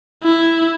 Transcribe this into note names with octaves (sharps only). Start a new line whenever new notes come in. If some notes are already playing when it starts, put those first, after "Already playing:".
E4